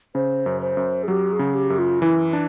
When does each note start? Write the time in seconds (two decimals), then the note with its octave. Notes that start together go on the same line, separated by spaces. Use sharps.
0.15 C#3 C5
0.46 F#2
0.62 C5
0.77 F#2
1.03 G#4
1.08 F#3 G4
1.32 G#4
1.39 C#3
1.55 G4
1.70 F#2
1.78 F4
2.02 E3 E4
2.33 D4